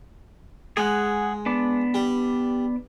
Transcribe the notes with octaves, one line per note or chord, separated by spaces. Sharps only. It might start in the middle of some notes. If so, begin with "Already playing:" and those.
G#3 G#4 F#5
B3 D4
G3